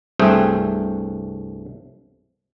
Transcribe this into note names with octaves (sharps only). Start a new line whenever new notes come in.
C2 G2 A3 C4 G#4 G5